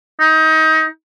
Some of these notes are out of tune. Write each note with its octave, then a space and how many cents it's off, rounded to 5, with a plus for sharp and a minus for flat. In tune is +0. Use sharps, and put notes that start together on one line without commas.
D#4 +25